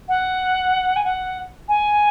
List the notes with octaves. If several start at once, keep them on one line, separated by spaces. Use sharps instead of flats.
F#5
G#5
F#5
G#5